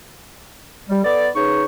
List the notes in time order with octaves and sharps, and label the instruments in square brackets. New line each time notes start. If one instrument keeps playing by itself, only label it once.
[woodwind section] G3
B3 A4 D5
C#3 D#4 G#4 B4 C#6